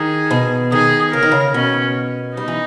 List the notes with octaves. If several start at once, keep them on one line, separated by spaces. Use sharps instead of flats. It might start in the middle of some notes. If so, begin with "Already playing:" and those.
Already playing: D#3 G#4
B2
D#3 G#4
C#3 A#4
D#3
C#3
B2 C#4
G3 D#4
E3